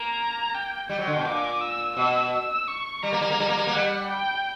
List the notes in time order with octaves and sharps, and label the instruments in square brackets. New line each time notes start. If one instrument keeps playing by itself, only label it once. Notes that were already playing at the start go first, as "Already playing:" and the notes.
Already playing: [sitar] A#3 [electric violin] A#5
[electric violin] G5
[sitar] G3 [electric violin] G5
[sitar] F#3
D3
B2
[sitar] A#2 [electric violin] D6
[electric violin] E6
[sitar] B2 [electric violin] E6
[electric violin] E6
C#6
[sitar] G3 [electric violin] A#5
[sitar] A#3
G3
A#3
G3
A#3
G3
A#3
[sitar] G3 [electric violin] F#5
[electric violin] G5